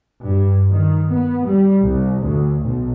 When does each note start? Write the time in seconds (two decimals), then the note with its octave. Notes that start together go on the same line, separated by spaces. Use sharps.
0.24 G2
0.71 D#3
1.08 B3
1.45 G3
1.84 C2
2.23 D2
2.61 B1